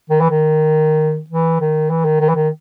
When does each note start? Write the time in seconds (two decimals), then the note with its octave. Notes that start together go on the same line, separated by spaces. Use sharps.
0.10 D#3
0.21 E3
0.31 D#3
1.30 E3
1.60 D#3
1.90 E3
2.05 D#3
2.20 D#3
2.29 E3
2.35 D#3